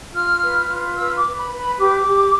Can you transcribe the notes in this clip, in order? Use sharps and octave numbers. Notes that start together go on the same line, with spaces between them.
F4 F6
B4
F4
B4 E6
D6
B4
B5
B4
B5
G4 D6
G4